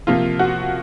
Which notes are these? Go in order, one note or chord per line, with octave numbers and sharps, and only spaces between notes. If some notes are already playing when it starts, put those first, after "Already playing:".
C3 F3 A#3 F4
F#4